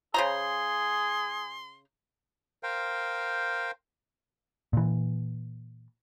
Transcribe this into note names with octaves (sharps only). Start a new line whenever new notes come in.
C#3 G#4 C5 A#5 C6
A#4 C5 F5 G5
A#2 E3